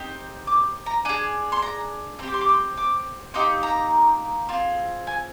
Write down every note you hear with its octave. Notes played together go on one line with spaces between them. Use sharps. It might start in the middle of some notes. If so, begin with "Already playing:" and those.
Already playing: C4 D#4 G4
D6
A#5
D4 G#4 G#5
C6
A#5
C4 G4 C6 D6
C6
D6
C6
D6
A#3 D#4 G4 C6
A#5
C4 F4 G#4
G#5